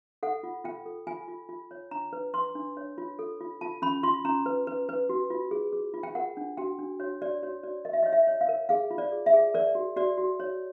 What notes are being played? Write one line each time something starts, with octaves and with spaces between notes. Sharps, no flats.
A4 F#5
F4
F4 G5
A4
F4 G#5
F4
F4
C#5
D4 A#5
B4
B4 C6
D4
C#5
F4
A4
F4
F4 A5
C#4 B5
F4 C6
C#4 A#5
B4
B4
B4
F#4
F4
G#4
G#4
F4
G5
A#4 F#5
D4
F#4 G5
D4
F#4 C#5
F#4 D5
F#4 C#5
F#4 D5
A#4 D#5
E5
D#5
C#5
E5
C#5
F5
A#4
G#4 F5
F4
D5
G#4
E5
G#4
A#4 D5
F#4
F#4 D5
F#4
C#5